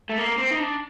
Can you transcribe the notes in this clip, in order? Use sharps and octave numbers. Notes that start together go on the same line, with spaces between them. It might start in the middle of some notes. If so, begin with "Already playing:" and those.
A3
A#3
C4
D#4
D4